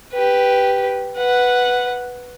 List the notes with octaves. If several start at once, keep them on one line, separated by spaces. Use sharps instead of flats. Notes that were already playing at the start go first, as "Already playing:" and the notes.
G4 B4
B4 F#5